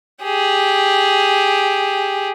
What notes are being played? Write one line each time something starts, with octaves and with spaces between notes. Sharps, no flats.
G4 G#4